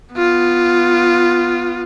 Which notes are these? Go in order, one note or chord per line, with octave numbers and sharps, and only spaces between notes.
B3 F4